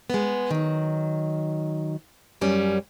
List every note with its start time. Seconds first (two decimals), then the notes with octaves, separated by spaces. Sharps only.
0.10 G#3 B3
0.51 D#3 F#3
2.41 F#2 G3 C#4